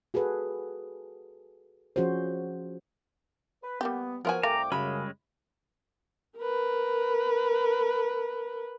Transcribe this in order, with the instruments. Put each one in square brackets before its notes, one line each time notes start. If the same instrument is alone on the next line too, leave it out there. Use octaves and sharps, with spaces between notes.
[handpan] F#4 G#4 A4 B4
F3 C#4 F#4 G#4 C5
[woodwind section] B4
[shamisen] G3 A#3 G4 [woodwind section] B3
[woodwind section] F3 [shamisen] B3 F4 F#4 [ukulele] A#4 G#5
[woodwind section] C2 G5 D6 [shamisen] A3 F5 [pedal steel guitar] A#5
[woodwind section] F#2 C#3 [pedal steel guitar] G3 G#3 C#4 [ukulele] B5
[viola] A#4 B4